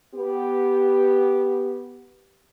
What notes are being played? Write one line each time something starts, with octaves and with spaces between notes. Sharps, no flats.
B3 G4